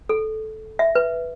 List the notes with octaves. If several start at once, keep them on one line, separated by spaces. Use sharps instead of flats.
A4
E5
B4